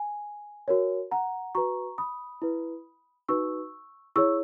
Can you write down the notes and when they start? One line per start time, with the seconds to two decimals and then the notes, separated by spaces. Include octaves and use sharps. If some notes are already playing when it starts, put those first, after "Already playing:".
Already playing: G#5
0.68 F#4 A#4 C#5
1.11 F#5 A#5
1.55 F#4 B4 A#5 C#6
1.98 B5 D#6
2.42 E4 B4
3.29 D#4 F#4 B4 C#6 E6
4.16 E4 G#4 C#5 C#6 E6